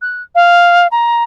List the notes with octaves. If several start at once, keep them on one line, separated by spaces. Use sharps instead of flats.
F#6
F5
A#5